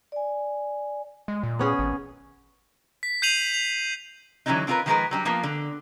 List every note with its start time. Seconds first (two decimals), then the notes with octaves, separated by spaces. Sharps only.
0.12 D5 G#5
1.28 G#3
1.43 A#2
1.59 B3 C#4 G#4
1.79 G#1
3.03 B6
3.22 G6 C7 D#7 F7 F#7
3.54 F7
4.46 D3 E3 F#3 A3 C#4 D#4
4.67 C4 D4 F4 G4 A#4 B4
4.86 D#3 F3 G#3 G#4 A#4 B4
5.11 F#3 G3 D4
5.25 F3 A#3 B3 F4
5.43 D3